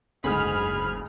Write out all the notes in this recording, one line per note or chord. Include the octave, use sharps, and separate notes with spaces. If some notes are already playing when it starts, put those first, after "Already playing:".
F#1 D2 G#2 G#4 B5 F6